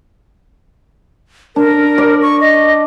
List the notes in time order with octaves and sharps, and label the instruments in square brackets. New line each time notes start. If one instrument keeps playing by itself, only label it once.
[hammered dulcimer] D4 [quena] A#4
[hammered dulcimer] D5
[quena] C#6
D#5